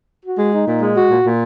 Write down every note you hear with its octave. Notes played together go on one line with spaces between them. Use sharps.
F#4
G#3
D#4
A#2
G#3
F#4
A#2
A#2